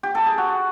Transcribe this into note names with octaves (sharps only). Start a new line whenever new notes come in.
G4
A4
G#4
F#4